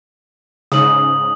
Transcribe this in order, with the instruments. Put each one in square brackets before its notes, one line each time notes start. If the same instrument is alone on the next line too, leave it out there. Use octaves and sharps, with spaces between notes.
[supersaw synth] G#2 C#3 [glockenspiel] D#6 F#7